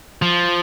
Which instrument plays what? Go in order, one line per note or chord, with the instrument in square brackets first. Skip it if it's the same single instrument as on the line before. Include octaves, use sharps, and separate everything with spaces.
[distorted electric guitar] F3